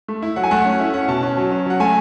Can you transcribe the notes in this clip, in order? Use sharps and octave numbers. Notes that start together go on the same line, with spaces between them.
A3
E4
F#3 F#5
G#5
A3 F#5
C#4
E4
C#4 F#5
B2 A5
C#4
F#3
C#4
F#3 F#5
A3 G#5